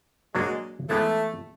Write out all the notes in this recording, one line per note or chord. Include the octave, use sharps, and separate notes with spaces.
F#3 G#3 A#3 D4 F#4 A#4
E3 G#3 A3 B3 E4 A4